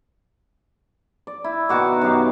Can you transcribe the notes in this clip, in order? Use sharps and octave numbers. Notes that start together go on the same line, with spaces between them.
D5
E4
B2 D#3 F#4 D6
F#2 D#4 G4 F5